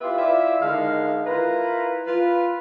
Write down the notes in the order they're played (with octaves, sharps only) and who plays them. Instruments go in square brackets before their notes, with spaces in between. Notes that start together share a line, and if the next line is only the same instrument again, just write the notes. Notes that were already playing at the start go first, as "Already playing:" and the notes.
[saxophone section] E4 F4 G4 B4 E5
E4 F4 D5 E5
D3 D#3 G#3 F5
E4 F4 A#4 B4
F4 B4